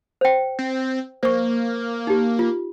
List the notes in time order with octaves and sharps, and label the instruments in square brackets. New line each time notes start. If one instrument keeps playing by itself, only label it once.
[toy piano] C5 G5
[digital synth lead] C4
[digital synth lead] A#3 [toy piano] C5 C#6
[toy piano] D#4 G4
F4